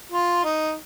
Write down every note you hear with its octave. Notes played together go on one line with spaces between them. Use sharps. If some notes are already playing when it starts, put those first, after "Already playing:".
F4
D#4